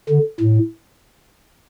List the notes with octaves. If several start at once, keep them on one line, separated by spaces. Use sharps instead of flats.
D3
A2